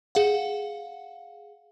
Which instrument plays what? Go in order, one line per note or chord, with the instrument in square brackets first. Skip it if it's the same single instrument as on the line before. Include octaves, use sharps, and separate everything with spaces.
[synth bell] G#4 F5 F#5